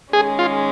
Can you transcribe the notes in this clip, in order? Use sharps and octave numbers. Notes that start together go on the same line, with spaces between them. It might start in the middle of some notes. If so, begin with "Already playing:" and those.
D#3 G#3 C#4 G#4
F4